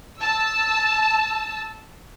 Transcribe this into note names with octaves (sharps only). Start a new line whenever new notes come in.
A5 E6